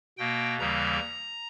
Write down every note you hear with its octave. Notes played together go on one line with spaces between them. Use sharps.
B2 A#3 G5
D#2 C#3 E3 G3 A#3 A#5